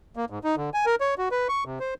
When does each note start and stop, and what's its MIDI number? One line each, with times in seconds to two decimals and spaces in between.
0.16 0.25 58
0.30 0.39 44
0.44 0.55 63
0.57 0.70 50
0.74 0.86 80
0.86 0.95 70
1.01 1.14 73
1.18 1.29 66
1.31 1.48 71
1.49 1.64 85
1.65 1.79 48
1.80 1.94 72